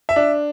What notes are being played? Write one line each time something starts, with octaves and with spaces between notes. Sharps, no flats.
E5
D4